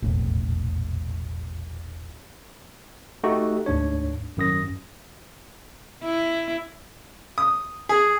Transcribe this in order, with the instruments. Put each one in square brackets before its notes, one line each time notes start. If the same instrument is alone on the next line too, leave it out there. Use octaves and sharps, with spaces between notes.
[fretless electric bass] E1 A#1 F2 A2
[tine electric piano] A3 D#4 F#4 G4
D2 G#2 D4 C#5
G#1 F#2 D#6 A#6
[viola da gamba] E4
[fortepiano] D#6
G#4